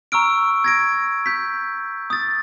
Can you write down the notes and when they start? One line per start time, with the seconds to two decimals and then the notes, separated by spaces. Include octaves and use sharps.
0.12 A#5 C#6 E6 F6 D7
0.64 G#6 A#6 D7
1.26 G6 B6
2.10 D#6 A6